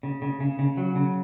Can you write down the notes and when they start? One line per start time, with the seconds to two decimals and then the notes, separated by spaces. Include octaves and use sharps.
0.03 C#3
0.22 C#3
0.40 C#3
0.59 C#3
0.77 F#3
0.96 C#3